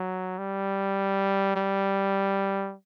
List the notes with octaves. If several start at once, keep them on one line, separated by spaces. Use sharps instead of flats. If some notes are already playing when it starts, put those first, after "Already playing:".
Already playing: F#3
G3
G3